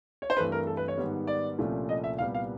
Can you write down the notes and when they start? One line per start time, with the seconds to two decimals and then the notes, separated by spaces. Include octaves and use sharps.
0.22 C#5
0.30 C5
0.36 G2 E3 A3 C4 B4
0.52 A#4
0.67 A4
0.77 B4
0.88 C#5
0.98 G#2 D#3 G3 B3
1.27 D5
1.58 C2 A#2 F3 A3 C#4
1.89 D#5
2.04 E5
2.19 C2 A#2 G3 B3 F5
2.35 F5